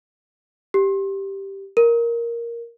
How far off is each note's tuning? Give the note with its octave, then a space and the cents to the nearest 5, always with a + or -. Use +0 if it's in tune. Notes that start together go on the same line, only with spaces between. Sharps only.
G4 -5
A#4 +5